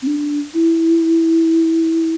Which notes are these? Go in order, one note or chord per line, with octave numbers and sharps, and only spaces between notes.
C4
D4
E4